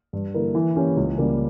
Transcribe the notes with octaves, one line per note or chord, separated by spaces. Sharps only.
G2
D3 A#3 E4 A#4
E3
A#3 C#4 G4
C#2
C#3 G3 A#3